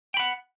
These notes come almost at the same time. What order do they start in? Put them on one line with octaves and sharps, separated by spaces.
G5 B5 F#5